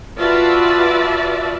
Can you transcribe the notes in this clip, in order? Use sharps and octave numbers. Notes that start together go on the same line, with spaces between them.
F4 F#4 B4 D5 E5 A5